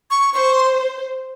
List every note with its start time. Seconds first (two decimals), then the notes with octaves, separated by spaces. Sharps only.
0.10 C#6
0.34 C5 C#6
0.53 C6